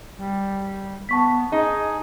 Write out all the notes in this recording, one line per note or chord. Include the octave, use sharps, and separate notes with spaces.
G3
B3 A5 C#6 B6
D#4 G#4